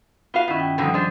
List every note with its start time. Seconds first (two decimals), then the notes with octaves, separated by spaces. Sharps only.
0.34 B3 F4 F#4 F5
0.48 G2 D#3 B3 C#4 E4
0.60 G5
0.78 G#2 B2 D3 F3 G3 D#6
0.94 G#3 D4 C5 G6